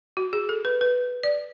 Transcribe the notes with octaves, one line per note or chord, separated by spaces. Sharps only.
F#4
G#4
A4
B4
B4
D5